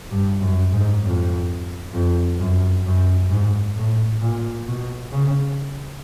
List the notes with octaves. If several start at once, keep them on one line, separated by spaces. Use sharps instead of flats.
G2
F#2
G#2
F2
F2
F#2
F#2
G#2
A2
A#2
B2
C#3